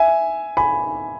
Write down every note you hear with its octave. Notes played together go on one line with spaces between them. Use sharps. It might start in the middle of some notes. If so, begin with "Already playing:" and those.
Already playing: E5 G#5
G#5 B5